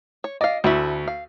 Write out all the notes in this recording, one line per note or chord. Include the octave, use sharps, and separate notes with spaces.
C#5
D5 D#5 F5
D2 A3 E4
F5